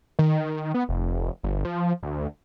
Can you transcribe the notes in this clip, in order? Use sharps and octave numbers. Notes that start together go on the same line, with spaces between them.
D#3
B3
F1
G1
F3
D2